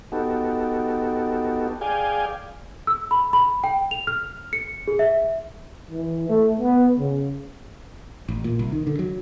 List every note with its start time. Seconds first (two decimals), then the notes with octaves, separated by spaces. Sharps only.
0.12 B3 D#4 F#4 G4 A4
1.81 G#4 D5 F5 G5 G#5
2.87 E6
3.11 B5
3.33 B5
3.64 G5
3.91 F7
4.07 F6
4.53 C#7
4.88 G#4
4.99 E5
5.90 E3
6.29 A3
6.60 B3
6.99 C#3
8.28 A1
8.44 A#2
8.59 C2
8.72 D#3
8.87 D3
8.99 F#3